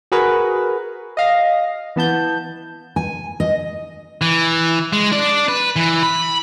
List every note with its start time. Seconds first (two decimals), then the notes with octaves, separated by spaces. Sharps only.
0.12 F#4 G#4 A#4 B4
1.17 D#5 F5 A#6
1.96 E3 B3 A5 G6
2.96 G#5
3.40 D#5
4.21 E3
4.93 G#3
5.12 D4 D5
5.48 B4
5.76 E3
6.03 B5